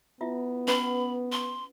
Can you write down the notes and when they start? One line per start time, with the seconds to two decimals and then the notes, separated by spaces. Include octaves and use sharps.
0.21 B3 E4 F4 E5
0.68 C#4 B4 F#5 B5
1.32 C6